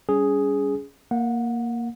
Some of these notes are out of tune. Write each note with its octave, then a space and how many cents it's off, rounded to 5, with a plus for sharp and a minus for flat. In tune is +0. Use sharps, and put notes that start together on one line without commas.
G3 +0 C#4 +25 G#4 +0
A#3 +0 F#5 -25